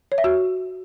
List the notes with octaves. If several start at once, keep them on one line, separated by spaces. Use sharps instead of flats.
C#5
E5
F#4